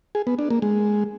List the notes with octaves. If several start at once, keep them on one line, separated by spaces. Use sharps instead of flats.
G#4
B3
D4
A#3
G#3